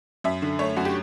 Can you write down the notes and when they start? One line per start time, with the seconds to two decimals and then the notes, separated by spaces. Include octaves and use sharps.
0.24 F#2 E5
0.42 D3
0.59 A3 C#5
0.77 F#2 F#4
0.85 G4